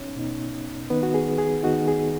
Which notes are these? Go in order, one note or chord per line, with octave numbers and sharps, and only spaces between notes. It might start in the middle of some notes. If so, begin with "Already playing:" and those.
Already playing: B2 B3 C#4 D#4 C#5
B2 B3 D#4
D#3 B3 D#4 B4
F#4
G#4
G#4
D#3 B3 D#4 F#4
G#4